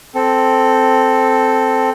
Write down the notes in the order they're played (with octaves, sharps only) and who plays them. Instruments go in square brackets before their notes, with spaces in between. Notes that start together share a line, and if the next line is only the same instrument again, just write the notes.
[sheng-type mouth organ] C4 A4